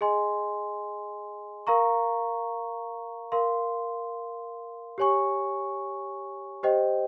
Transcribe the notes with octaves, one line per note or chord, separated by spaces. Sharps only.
G#4 D#5 G#5 C6
A#4 F5 A#5 C#6
A#4 F5 C6
G4 C#5 G#5 C#6
G4 C5 D#5 G5